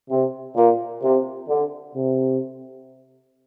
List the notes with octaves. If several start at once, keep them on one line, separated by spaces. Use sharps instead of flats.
C3
A#2
C3
D3
C3